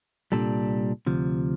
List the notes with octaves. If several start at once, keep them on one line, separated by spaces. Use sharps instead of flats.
C2 A#2 G3 D4 A4
D2 C3 F3